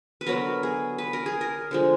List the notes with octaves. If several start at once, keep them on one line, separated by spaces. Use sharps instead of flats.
B4
D3 F#3 B3 A#4
G#4
B4
A#4
G#4
A#4
D3 F3 G#3